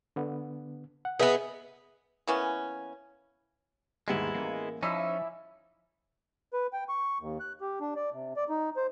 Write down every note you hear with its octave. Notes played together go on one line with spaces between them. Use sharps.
D3 B3
F#5
B3 G#4 B4 D#5 E5
E3 A#3 B3 C#4
D#2 G#2 G#3 B3 E4 G4
A1 A#3
F3 C#4 D#4 E4 D5 E5 E6
B4
G5
C#6
D#2
F#6
G4
D4
D5
C3
D5
D#4
C5